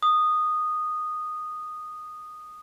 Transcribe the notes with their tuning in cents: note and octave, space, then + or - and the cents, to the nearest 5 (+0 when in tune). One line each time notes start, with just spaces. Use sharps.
D#6 -10